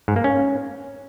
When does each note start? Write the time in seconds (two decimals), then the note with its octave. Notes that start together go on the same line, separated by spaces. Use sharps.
0.08 G#2
0.16 A#3
0.24 C#4